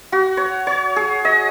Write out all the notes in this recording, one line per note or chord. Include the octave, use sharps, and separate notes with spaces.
F#4
C#5
C#5
G#4
D#5